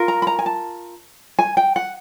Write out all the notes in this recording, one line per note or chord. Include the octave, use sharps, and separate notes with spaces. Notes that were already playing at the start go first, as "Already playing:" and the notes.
Already playing: F4 A#4
A#5
B5
A#5
G#5
A5
G#5
G5
F#5